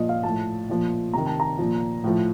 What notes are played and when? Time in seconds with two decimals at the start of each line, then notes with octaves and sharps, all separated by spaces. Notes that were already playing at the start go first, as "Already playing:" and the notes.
Already playing: A#2 F3 D#5
0.09 F5
0.23 A2 F3 A5
0.69 A#2 F3
1.14 C3 D#3 A#5
1.26 A5
1.40 A#5
1.58 A#2 F3
2.04 A2 F3